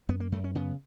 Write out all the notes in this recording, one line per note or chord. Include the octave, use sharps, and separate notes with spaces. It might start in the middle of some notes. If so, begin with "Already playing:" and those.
F#2 B3
A#3
F#2 A3
C#4
C#3 B3